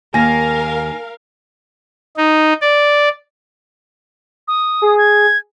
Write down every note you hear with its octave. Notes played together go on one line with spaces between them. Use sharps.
D#2 A#4 F5 G#5 A#6
D#4
D5
D#6
G#4
G#6